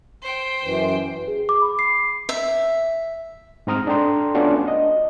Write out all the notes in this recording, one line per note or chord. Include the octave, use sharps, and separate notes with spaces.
C5 G5
F#2 E3
G#4
D6
B5
C7
E5
G#2 C4 A#5 D#6 F6
D4 A4 G5 A#5 C6
A3 B3 C#4 D4 F4 F#4
D#5